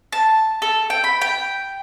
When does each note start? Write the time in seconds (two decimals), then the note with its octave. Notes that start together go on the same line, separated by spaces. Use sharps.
0.12 A5
0.62 A4
0.90 G5
1.04 B5
1.21 G5